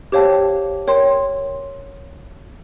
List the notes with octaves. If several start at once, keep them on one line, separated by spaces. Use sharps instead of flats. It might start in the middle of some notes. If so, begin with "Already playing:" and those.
G4 C5 C#5 F5 G5 A5
A#4 C#5 G5 C6